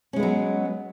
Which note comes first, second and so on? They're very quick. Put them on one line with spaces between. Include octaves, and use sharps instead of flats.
C#4 G#3 B3 F#3